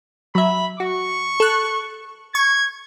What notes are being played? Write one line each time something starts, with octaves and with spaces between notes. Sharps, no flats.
F#3 E5 B5
F#4 C#6
A4 F#6
C#6 G#6